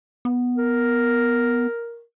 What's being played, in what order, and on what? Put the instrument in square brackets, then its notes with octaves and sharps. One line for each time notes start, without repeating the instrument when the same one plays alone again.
[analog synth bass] B3
[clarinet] A#4